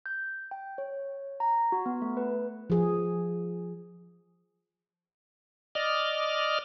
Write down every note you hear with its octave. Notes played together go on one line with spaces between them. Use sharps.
G6
G5
C#5
A#5
F#4
B3
A3
B4
F3 G#4
D5 D#5 F6